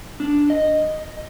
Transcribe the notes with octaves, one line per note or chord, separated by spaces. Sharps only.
D4
D#5